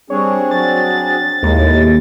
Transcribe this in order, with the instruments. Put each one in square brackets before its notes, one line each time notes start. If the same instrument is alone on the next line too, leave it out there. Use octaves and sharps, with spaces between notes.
[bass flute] G3 [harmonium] C4 D4 G#4 [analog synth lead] C#5
[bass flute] F#3 [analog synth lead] A6
[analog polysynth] D#2 [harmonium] A2 [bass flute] G#3